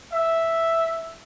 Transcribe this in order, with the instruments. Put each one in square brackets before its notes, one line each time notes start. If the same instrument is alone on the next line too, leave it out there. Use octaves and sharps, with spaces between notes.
[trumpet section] E5